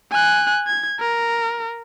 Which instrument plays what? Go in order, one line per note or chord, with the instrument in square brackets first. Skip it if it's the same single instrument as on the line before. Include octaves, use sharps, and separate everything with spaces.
[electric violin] G#5 F#6
G#6
A#4